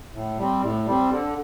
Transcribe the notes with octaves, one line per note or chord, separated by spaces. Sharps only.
A2
G3 C4
A2
G3 C4
D3